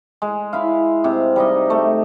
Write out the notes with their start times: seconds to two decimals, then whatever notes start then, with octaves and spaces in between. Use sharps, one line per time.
0.22 G#3
0.53 E4 F5
1.04 C3
1.36 G3 D#4 D#5
1.70 A3